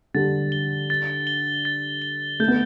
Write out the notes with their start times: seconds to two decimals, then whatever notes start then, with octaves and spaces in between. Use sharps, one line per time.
0.14 D3 G3 A6
0.52 G7
0.90 A6
1.27 G7
1.65 A6
2.02 G7
2.40 A3 G6
2.48 B3